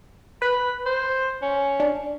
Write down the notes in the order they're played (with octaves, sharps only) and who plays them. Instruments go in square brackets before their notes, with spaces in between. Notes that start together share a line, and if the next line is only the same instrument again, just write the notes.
[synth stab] B4 [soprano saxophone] B5
[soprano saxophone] C5
C#4
[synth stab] D4